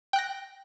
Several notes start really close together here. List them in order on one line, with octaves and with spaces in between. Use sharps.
G5 F#6 A#6